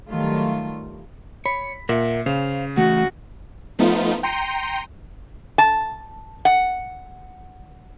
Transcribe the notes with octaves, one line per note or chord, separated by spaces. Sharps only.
D#3 F#3 G3 A3 F4
C#5 B5
A#2 A#4 E5 F#5
C#3 C5 F5
E3 A3 F#4
F3 A3 B3 D#4 F4
G5 A#5 C6 C#7 D#7
A5
F#5